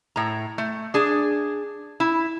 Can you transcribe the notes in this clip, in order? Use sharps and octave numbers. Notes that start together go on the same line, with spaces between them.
A2 A#5
A3
D4 G#4
E4